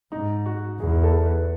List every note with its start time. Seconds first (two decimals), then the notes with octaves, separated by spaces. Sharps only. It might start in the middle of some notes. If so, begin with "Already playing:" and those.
0.12 G#2 D#4
0.46 F#4
0.80 E2 G#4
1.03 A4
1.25 B4